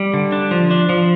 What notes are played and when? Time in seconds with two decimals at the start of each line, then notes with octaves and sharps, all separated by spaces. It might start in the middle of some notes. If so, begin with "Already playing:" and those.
Already playing: G3
0.14 D3
0.32 D4
0.51 F3
0.71 D4
0.89 F3